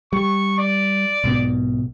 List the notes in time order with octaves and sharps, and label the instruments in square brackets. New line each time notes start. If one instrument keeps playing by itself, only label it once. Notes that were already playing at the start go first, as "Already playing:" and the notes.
[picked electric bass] G3 [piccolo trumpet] C#6
[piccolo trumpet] D5
[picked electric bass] B1 G#2 B2